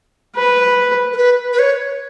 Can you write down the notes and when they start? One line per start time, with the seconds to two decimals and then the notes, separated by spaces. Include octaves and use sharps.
0.35 B4
1.13 A#4
1.17 B4
1.53 B4
1.59 C#5